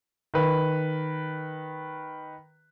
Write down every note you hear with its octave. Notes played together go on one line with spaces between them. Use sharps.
D#3 B4